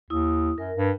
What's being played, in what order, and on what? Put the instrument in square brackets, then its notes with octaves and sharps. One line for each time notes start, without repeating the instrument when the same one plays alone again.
[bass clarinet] D#2 [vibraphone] E4 D#6
[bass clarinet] F#2 [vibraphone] A#4
[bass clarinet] G2